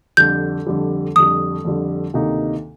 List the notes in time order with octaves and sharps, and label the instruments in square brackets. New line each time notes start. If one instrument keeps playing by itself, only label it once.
[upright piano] F2 D3 G3 [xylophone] G6
[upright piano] F2 D3 G3
[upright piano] F2 D3 G3 [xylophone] D#6
[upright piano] F2 D3 G3
D2 C3 D#3 A#3 D#4